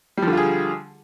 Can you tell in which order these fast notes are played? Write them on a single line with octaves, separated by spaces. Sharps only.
G3 F3 D3 F4 G#4